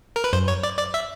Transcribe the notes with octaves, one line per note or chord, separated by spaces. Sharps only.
A#4
B4
F#2 C5
C#5
D5
D5
E5